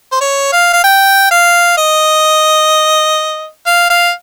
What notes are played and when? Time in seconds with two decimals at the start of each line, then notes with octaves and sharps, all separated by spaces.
0.12 C5
0.21 C#5
0.52 F5
0.73 F5
0.84 G5
1.31 F5
1.78 D#5
3.67 F5
3.90 F5